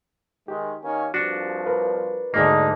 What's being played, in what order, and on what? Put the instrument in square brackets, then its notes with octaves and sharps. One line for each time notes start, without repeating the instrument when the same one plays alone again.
[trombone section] D#3 G#3 [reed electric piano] G4
[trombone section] D#3 A#3 C#4
[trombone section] C2 G2 F3 [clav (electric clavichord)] D4 F#4
[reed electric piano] A#4 B4
[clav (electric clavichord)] D2 G#2 A#3 [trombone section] F#3 D4 D#4 [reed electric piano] G#3 G#4